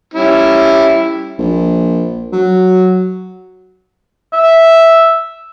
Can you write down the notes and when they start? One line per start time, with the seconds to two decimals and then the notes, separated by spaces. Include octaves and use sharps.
0.14 G3 C#4 E4
1.38 A#1
2.32 F#3
4.33 E5